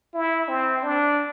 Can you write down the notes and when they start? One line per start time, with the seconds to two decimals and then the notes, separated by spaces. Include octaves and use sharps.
0.14 E4
0.48 C4
0.83 D4